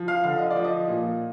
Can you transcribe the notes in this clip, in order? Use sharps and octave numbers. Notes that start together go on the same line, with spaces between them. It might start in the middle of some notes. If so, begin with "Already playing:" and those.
Already playing: F3
F5
D3 F5
D#5
D5
F3
D#5
A#2